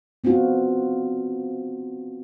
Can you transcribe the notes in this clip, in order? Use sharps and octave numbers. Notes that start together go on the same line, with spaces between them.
B3 C4 D4 F4 F#4